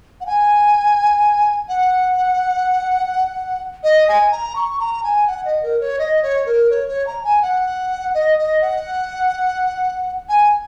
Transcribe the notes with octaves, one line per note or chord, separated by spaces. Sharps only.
F#5
G#5
F#5
D#5
G#5
A#5
C#6
A#5
G#5
F#5
D#5
A#4
C#5
D#5
C#5
A#4
C#5
C#5
A#5
G#5
F#5
D#5
D#5
F#5
G#5